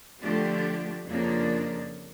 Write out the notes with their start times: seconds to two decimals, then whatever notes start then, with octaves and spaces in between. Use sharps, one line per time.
0.21 D3 F3 A3 D4 G4
1.06 F2 C#3 F3 A#3 D4